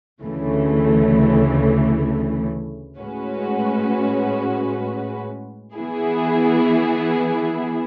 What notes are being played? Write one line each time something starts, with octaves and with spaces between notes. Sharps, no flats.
D2 C#3 E3 A3
A2 G#3 C#4 F#4 B4
E3 B3 E4 G#4